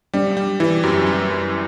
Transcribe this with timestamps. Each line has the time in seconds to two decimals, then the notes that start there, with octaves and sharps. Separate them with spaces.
0.13 G3 D4
0.37 G3
0.60 E3 E4
0.83 F#2 G4
1.07 G3
1.30 F#2